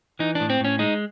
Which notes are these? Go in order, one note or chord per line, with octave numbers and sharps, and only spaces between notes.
E3 D#4
A2 D4
C4
A2 C#4
G#3 D#4